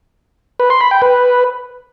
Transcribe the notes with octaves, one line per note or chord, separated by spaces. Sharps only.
B4
C6
B5
G5
B4